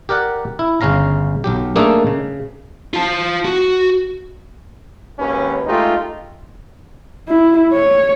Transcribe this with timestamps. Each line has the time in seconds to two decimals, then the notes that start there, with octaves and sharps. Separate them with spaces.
0.09 G4 A#4 D5 F#5
0.59 E4
0.81 G1 C#3 C#4 F5 A#5
1.44 B1 F#3 G4
1.76 A3 A#3 D4 D#4 G#4 A4
2.07 C#3
2.94 F4 A5
3.45 F#4
5.18 G#1 D#2 C#4 B4
5.66 G#3 A3 D#4 F4 G4
7.28 E4
7.73 C#5